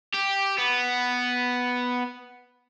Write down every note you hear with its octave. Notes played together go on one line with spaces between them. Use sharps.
G4
B3